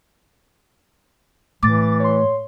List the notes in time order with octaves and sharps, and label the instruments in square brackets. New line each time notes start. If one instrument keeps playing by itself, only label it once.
[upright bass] A2 [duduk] E3 [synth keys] D6 A6
[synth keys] C#5 C6